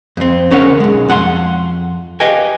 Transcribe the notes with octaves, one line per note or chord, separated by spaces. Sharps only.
F2 C4
C#2 D3 C#4 A#4 C#5 F#5
B1 G#3
F2 F#5 A#5 C6
G4 B4 D#5 F5 G5 G#5